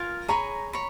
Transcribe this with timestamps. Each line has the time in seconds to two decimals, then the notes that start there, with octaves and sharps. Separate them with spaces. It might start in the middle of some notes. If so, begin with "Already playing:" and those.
Already playing: F4 A#4 F5 G#5
0.28 G#4 C#5 G#5 A#5 B5
0.73 C#5 B5